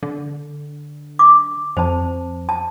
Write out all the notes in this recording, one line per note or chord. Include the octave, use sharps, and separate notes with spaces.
D3
D6
F2 C5 A5
A5